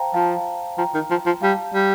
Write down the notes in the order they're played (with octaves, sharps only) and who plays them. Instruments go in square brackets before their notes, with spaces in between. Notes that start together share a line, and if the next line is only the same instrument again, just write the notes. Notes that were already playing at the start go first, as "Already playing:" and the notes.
Already playing: [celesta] C5 F5 G5 A5 A#5
[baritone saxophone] F3 [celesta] F5 A5
[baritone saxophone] F3 [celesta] G5 A#5
[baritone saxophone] D#3
F3
F3
[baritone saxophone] G3 [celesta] F5 A5
[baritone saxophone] G3